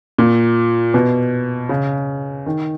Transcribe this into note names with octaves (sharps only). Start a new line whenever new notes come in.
A#2
B2
C#3
D#3